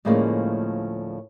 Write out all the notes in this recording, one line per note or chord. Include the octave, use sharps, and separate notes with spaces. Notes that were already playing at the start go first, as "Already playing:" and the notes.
D2 A2 F3 G#3 A#3 C#4